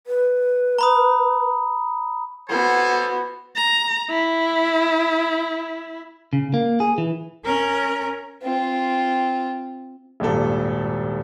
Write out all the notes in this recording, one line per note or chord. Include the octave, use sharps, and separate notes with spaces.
B4
A#5 B5 D#6
B3 F#4 A4 C5 G#5
A#5
E4
C#3
A#3
G#4
E3
C#4 A#4
C4 F4
D#1 G#1 G2 A#2 A4